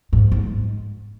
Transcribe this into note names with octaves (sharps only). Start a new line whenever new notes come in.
G#2
G#2